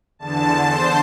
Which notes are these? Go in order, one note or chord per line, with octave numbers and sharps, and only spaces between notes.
E2 D3 A5
C5